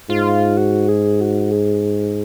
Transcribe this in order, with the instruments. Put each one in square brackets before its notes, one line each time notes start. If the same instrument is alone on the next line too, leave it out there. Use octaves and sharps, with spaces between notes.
[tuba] G#2 [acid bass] F4
[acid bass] F#4
G#4
F#4
G#4